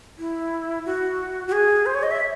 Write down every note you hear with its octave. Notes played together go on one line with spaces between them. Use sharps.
E4
F#4
F#4
G#4
C5
C#5
D#5
E5